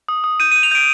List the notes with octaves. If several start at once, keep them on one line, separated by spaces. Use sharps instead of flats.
D#6
D#6
G6 D#7
D#7
G6
F7
G6 D7